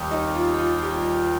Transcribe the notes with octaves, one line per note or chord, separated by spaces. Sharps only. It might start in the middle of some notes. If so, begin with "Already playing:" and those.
Already playing: D#2 D#3 G3 A#3 G4
D#4
F4
F4
G3 G4